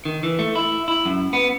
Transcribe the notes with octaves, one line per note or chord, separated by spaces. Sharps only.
D#3
E3
A3
E4
E4
F#2
B3